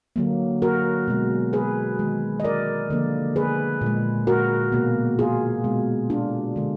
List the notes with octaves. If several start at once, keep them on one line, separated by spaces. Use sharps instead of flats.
D3 F#3 A#3
F#4 A#4
B2 G#3
G#4 B4
D#3 G#3
D#5
A#4 D5
D3 F3 A#3
G#4 B4
A#2 G#3
F#4 A#4
B2 A#3
F4 G#4
B2 G#3
D4 F4
D3 G#3